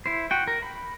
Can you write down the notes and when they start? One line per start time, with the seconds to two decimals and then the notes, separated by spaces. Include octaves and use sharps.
0.06 E4 C5
0.31 F#4 G5
0.47 A#4
0.62 B5